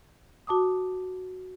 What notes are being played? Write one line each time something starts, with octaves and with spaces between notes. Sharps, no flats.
F#4 A5 D6 D#6